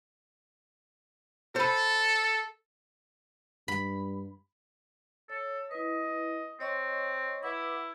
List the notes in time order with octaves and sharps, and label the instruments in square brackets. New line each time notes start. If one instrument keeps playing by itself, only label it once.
[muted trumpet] A4 [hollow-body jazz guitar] C5 B5
[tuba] G2 [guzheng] B5
[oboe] A4 [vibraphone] C#5
[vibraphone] E4 B4 [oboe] D#5
[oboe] C4 [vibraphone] C#5 D#5 C#6
[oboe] E4 [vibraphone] B4 F#5 D6